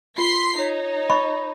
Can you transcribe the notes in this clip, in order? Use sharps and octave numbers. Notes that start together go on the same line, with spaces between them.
F4 C6 B6 C7
D#4 C#5
D#5 B5 C#6